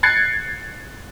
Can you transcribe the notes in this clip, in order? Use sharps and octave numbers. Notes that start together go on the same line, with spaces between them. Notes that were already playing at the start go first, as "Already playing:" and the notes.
F#6 G#6 A6 C7 C#7